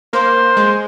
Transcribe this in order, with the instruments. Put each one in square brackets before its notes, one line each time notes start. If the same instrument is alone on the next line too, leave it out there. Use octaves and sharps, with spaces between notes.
[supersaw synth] A#3 [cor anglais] C5
[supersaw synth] G#3